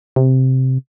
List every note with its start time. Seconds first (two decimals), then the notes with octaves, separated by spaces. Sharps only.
0.16 C3